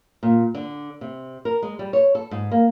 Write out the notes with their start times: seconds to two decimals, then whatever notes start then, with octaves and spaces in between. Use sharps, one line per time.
0.23 A#2
0.55 D3
1.01 C3
1.45 A#4
1.63 G#3
1.79 G3
1.93 C#5
2.15 A4
2.31 G#2
2.52 A#3